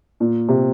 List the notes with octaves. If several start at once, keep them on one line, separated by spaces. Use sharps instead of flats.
A#2
C3